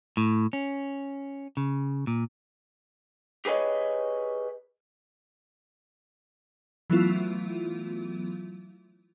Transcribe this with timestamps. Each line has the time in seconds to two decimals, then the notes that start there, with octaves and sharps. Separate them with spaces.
0.17 A2
0.53 C#4
1.57 C#3
2.07 A#2
3.45 G4 G#4 B4 C#5 D#5
6.90 E3 F#3 A3 B3 E4 F4